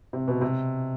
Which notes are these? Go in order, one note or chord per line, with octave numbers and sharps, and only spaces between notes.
C3
B2
C3